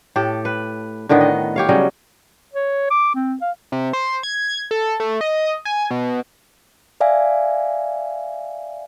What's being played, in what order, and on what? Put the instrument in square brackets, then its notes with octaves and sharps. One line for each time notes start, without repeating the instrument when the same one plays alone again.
[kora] A2 G4 A4
B4
A2 D3 D#3 B3
D#5
G4 C#5 F5
C#3 F#3 G3 D#5
[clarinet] C#5
D6
C4
F5
[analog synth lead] C3
C5
G#6
A4
A3
D#5
G#5
B2
[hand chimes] D5 E5 F5 G#5